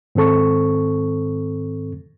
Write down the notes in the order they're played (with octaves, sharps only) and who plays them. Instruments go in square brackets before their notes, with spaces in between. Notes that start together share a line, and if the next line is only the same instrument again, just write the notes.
[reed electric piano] G#2 D#3 C4 A4 C#6